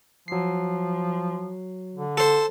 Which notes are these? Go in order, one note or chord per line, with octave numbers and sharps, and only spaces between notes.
F3 F#3 C7
D3
A4 C5